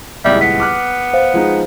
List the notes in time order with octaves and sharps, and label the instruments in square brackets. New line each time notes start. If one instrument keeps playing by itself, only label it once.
[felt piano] D#1 C#2 E4 [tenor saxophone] G3 [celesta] E5
[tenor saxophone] B3 [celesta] B6
[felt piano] D6 F6 F#6
[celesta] C5 F5
[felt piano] F3 G#3 D#4